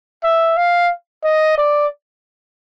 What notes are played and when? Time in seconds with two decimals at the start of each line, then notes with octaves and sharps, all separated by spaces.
0.24 E5
0.57 F5
1.24 D#5
1.58 D5